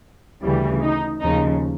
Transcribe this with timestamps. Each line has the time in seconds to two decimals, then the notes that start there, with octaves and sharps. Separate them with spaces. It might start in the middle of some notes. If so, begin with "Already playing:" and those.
0.43 D2 C#3 E3 G3
0.82 D#4
1.20 D#2 C#3 F3 D#4